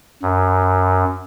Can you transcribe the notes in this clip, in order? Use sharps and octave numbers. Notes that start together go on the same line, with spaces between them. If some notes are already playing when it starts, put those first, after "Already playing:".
F#2